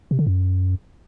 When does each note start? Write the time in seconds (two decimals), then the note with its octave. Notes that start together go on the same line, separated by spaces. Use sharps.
0.11 C3
0.19 D3
0.27 F#2